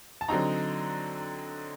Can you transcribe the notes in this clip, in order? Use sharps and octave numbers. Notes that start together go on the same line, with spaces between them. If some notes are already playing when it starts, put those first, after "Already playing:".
A5
D3 F#3 C4 D#4 A#5